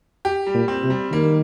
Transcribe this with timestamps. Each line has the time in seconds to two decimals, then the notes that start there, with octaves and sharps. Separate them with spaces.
0.25 G4
0.47 G3
0.54 A#2
0.68 C4
0.83 C3
0.90 G3
1.12 D#3 A#3